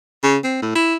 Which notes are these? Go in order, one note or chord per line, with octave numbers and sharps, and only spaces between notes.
C#3
C4
A2
E4